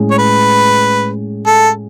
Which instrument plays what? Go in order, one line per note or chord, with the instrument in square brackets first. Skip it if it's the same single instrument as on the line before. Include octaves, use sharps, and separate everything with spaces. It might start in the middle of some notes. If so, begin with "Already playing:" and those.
Already playing: [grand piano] A2 G#3 C#4 G#4
[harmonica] C#5
B4
A4